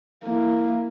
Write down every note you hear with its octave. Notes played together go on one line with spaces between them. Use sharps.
A#3 E4